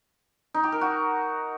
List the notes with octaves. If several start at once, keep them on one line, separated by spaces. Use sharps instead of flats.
D#4
G4
A#4
F#4